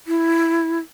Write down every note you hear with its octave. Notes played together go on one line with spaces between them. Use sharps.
E4